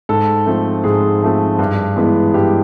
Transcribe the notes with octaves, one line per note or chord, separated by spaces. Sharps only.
G#2 A4
F3 A3 C4
G#2 G#4
F3 A3 C4
G2
E3 G#3 B3
G2 G4